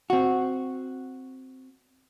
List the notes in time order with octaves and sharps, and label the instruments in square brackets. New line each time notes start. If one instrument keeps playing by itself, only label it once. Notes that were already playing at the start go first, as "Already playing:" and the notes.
[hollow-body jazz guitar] C4 F#4